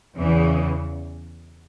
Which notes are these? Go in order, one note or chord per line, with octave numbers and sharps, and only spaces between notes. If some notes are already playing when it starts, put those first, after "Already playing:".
E2 C#3 E3